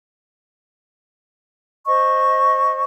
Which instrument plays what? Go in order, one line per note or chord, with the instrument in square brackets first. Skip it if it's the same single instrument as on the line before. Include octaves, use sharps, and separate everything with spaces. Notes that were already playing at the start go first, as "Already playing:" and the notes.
[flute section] C5 D#5 C#6